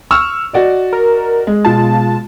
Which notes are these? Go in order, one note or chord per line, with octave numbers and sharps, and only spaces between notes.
C#6 E6 F6
F#4 D5 D#5
A#4
G#3
B2 F4 A5